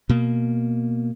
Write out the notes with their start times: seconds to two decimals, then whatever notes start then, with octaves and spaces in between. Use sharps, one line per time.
0.09 B2 A#3